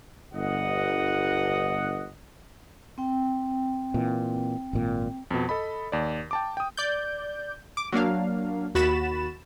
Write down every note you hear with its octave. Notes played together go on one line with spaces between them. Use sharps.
G1 D#5 F#5
C4 G5
A#2 E3
G#1 A#2
F2 B2
A4 D#5 B5
D#2 D5
G5 A5 D6
G5 D#6
D5 G6
D6
F#3 A#3 D4 F5
D#2 F#4 B5 A6 E7